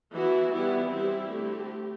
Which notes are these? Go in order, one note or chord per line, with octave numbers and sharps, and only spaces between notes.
E3 B3 E4 F#4
E3 G3 B3 E4 G4
G3 C4 E4 G4
D3 A3 C4